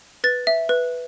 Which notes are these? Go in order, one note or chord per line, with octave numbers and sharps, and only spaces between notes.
B4 A6
E5
B4